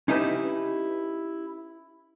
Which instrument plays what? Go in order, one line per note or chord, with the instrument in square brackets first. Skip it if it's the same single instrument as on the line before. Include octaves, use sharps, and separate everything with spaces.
[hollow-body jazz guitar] C#4 D#4 E4 G4 B4